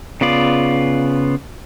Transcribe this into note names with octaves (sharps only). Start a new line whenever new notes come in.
C#3 B3 F4 D5